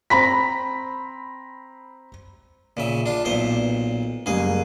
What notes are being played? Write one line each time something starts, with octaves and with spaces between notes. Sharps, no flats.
C4 A#5 B5 B6
A#2 C#3 E5
D4 F4
B1 A#2 C5
F#1 G3 A#3 G#4